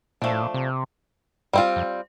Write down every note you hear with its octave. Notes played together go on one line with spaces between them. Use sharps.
A#2 F3 A3 D4
A2
A#2
C3
G2 G3 C4 F4
F2